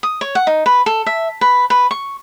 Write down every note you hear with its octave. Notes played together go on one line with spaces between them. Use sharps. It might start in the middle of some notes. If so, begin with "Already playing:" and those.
D#6
C#5
F#5
D#4
B4
A4
E5
B4
B4
C#6